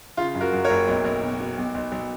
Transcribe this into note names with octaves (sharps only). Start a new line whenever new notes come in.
C#3 F4
F#2
F#4 A#4
F#2
A#4 C#5
F#1
B1
B1
B2
B2
B1
B1
B1